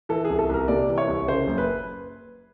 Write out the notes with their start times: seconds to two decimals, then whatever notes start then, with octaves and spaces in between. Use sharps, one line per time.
0.09 E3 A4
0.25 G#4
0.30 C2
0.39 A4
0.49 C2 A#4
0.68 C3 D5
0.89 E3
0.98 C#5
1.08 C2
1.28 C#3 C5
1.47 F#1
1.58 B4